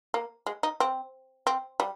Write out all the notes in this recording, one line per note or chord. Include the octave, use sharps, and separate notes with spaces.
A#3
G#3
D#4
C4
C4
G3